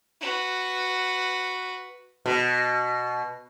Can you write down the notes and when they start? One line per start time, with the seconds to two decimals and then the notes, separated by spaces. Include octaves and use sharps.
0.21 F#4 B4
2.26 B2